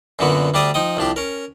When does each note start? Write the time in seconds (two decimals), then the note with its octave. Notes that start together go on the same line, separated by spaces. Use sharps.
0.19 F#2 A#2 D3 B3 F#4
0.54 D2 G3 D4 G4 D5 D#6
0.74 F3 D#4 G5 D#6
0.97 C2 F3 D4 G4
1.16 C#4 A#4